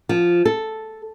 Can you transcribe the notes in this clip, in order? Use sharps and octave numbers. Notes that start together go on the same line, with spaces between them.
F3
A4